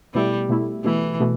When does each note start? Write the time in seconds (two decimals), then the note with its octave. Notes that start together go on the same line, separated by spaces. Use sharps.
0.14 B2 G3 A3 E4
0.49 B2 A3 E4
0.84 B2 E3 A3 E4
1.20 B2 A3